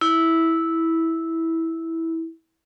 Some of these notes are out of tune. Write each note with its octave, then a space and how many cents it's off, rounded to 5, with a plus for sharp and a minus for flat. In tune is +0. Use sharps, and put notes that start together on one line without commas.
E4 -10